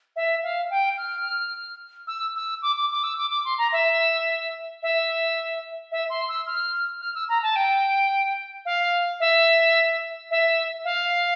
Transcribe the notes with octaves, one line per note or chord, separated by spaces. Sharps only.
E5
F5
G5
F6
E6
E6
D6
D6
D6
E6
D6
D6
C6
A#5
E5
E5
E5
C6
E6
F6
F6
E6
A#5
A5
G5
F5
E5
E5
F5